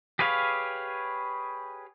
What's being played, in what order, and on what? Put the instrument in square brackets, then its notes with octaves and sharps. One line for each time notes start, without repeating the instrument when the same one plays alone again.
[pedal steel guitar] G4 G#4 B4 C#5 F5